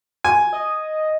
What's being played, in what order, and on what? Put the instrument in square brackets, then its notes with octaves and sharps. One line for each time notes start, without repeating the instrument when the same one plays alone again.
[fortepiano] G#5
[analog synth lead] D#5